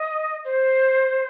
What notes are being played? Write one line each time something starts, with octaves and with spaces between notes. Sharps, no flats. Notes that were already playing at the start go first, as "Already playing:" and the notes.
Already playing: D#5
C5